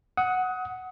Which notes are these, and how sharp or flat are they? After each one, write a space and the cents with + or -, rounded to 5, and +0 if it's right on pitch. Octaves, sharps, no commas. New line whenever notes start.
F#5 +0 D#6 +25